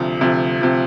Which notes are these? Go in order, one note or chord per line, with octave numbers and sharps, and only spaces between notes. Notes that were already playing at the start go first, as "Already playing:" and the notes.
Already playing: D2 C3 F3
D2 C3 F3
C3 F3